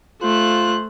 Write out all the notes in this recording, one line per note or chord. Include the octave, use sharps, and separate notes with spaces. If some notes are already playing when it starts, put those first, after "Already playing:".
A3 F4 C5 F#6